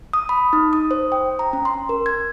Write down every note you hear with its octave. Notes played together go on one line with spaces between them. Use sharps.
D#6
B5
D#4
D#6
C5
G5
A#5
C#4
C6
A#4
G#6